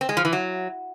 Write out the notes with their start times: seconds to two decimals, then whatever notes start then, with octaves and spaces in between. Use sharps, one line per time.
0.01 C4
0.09 G#3
0.17 F3
0.25 E3
0.33 F#3